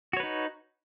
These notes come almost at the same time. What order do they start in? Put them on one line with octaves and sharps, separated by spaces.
F#4 C#5 B4 D#4